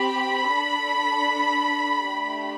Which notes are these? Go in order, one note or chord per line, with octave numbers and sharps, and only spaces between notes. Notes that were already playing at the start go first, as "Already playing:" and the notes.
Already playing: C4 G4 B5
D4 A4
A3 D4 G4